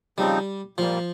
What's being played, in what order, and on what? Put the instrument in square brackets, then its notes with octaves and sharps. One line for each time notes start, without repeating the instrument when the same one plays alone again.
[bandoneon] C#3 F3 C4 D#4 [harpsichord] G3
[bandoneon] A#2 G3 A#3 [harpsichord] F3